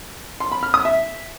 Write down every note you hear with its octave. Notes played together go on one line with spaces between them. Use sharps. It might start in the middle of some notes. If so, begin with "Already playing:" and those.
C6
B5
F6
D#6
E5